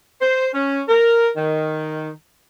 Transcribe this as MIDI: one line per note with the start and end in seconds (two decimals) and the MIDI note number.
0.21 0.47 72
0.53 0.81 61
0.88 1.28 70
1.35 2.09 51